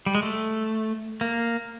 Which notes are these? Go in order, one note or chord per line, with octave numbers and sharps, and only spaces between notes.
G3
G#3
A3
A#3